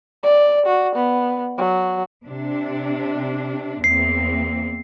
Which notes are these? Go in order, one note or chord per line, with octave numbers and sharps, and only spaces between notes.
D5
F#4
B3
F#3
C3 D4
E2 A#3 C4 C7